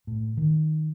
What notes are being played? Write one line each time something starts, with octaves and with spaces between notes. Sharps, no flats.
A2
D#3